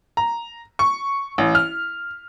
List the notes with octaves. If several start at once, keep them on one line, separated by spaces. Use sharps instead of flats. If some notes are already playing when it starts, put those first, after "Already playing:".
A#5
C#6
A1
F6